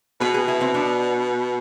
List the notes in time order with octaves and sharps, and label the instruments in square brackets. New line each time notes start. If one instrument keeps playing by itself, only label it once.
[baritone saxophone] B2 [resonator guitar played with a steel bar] G#4 B4
[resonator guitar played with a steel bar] G#4 B4
E4 G#4
C4 E4
B3 D4